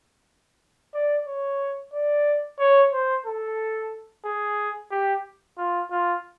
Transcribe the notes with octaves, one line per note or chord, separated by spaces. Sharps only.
D5
C#5
D5
C#5
C5
A4
G#4
G4
F4
F4